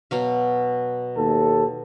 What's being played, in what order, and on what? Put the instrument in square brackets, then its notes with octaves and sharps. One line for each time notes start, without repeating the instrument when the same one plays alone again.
[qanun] B2 F#3 F5
[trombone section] D#2 A4